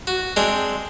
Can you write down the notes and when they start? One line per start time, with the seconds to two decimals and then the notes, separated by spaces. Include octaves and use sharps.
0.07 F#4
0.36 G#3 C4 D4